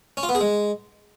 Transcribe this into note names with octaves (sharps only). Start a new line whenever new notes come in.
C#4
F4
B3
G#4
G#3